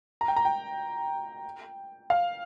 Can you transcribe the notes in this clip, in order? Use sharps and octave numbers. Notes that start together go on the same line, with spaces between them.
A#5
G5
A#5
G5
F5